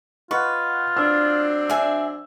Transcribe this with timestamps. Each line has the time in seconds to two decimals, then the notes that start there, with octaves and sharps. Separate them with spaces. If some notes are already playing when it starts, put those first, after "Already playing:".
0.31 F4 B4 D#5 F#5 C#6
0.97 F#3 C4 D4 E6 F6
1.70 E5 G#5 E6